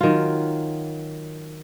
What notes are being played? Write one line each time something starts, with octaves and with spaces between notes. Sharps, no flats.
D#3 F#3 F4